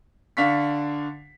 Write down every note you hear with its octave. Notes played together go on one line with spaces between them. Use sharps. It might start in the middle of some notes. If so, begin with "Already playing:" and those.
D3 D4 F5 C#6 B6